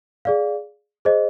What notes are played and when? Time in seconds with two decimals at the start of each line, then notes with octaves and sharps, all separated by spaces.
0.25 G#4 D5 F5
1.05 G#4 C5 D#5